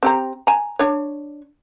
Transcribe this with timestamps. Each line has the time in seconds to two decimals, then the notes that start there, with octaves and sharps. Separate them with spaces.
0.03 C4 G4 A#5
0.47 G#5 A#5
0.79 D4 C#5